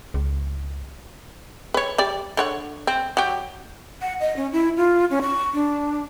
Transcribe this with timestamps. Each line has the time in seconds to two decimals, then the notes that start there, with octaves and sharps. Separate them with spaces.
0.14 C#2
1.74 B4 C#5
1.98 G3 D5
2.37 D3 C#5 F#5
2.87 C4
3.17 F#3 G4
4.02 F#5
4.20 D#5
4.37 C#4
4.53 E4
4.77 F4
5.10 C#4
5.22 C#6
5.54 D4